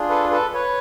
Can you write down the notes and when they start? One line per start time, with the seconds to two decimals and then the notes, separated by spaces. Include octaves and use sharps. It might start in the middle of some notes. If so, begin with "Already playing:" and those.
Already playing: D4 F4 G#4
0.09 A4 B4
0.31 A4 B4
0.54 B4 C#5